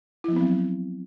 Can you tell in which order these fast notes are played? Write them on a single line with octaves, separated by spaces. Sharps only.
E4 F3 B3 C4 F#3